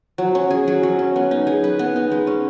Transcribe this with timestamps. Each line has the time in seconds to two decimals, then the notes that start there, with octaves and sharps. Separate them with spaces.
0.18 F#3
0.35 C#4
0.51 G#4
0.68 F#3
0.83 F#3
0.99 C#4
1.16 B3
1.31 D#4
1.47 G#4
1.64 B4
1.79 B3
1.96 D#4
2.12 G#3
2.27 C#4